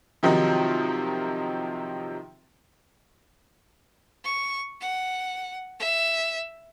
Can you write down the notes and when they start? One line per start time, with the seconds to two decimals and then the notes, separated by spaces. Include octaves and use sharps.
0.23 C3 D#3 F3 F#3 D#4
4.24 C#6
4.81 F#5
5.79 E5